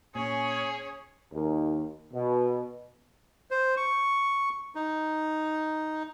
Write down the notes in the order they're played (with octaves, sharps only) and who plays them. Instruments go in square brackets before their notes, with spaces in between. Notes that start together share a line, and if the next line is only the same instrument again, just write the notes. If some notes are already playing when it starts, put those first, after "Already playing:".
[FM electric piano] A#2 [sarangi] C#4 [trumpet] G#4 [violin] C#5
[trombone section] D#2
B2
[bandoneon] C5
C#6
D#4